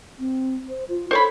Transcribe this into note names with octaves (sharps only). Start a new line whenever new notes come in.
C4
C5
F4
A4 C5 C#5 B5